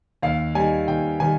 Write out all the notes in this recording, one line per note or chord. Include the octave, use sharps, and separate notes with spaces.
D#2 F5
D#3 G3 G#5
D#2 G5
D#3 G3 G#5